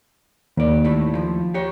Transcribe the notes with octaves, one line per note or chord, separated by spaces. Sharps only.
D#2 G#2 D5
A2 A3 E4
F3
G4 C#5